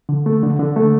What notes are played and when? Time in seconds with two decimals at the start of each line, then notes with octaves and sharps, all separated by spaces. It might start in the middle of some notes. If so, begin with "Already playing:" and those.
0.09 D3
0.26 A3
0.43 D3
0.59 D3
0.76 A3